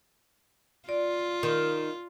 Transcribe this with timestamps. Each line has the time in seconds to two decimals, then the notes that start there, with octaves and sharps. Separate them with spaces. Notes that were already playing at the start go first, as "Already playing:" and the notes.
0.89 F4 D5
1.43 D#3